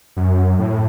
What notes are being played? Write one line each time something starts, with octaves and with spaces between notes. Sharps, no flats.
F#2
A2